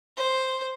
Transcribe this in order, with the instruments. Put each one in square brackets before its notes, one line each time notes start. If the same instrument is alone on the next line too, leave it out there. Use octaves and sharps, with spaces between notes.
[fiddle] C5